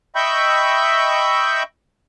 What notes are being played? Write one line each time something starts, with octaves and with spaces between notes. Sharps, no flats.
D#5 E5 G5 B5 C#6 G6